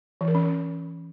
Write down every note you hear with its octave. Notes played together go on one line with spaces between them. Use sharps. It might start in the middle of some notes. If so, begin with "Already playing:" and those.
E3
A#4
C#4